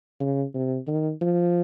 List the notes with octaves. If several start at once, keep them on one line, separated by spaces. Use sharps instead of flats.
C#3
C3
D#3
F3